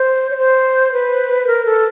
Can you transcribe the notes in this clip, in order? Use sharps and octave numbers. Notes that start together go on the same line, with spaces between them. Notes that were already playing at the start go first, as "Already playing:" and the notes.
Already playing: C5
C#5
C5
B4
A#4
A4